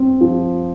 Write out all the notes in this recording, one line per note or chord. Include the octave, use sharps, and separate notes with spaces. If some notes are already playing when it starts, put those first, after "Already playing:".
Already playing: C4
F3